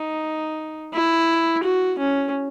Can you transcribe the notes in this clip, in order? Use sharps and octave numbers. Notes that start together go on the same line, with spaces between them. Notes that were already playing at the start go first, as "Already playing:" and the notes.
Already playing: D#4
E4
F#4
C#4